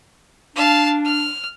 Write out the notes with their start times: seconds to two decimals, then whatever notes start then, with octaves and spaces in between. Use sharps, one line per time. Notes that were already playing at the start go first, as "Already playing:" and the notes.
0.56 D4 F5 A5
1.05 F6